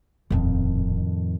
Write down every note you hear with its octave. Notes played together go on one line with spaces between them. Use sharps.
D#1 F2 A2 D#3 C4